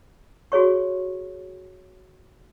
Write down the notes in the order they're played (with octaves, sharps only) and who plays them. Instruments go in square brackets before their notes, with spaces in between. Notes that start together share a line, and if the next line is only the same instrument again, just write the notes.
[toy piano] F#4 G#4 C#5 C#6